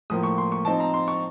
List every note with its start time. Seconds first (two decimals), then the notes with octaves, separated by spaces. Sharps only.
0.10 A2 F3 A#3 D#6
0.23 C#6
0.38 C6
0.52 C#6
0.65 F3 C4 D#4 A5
0.80 A#5
0.94 C6
1.08 C#6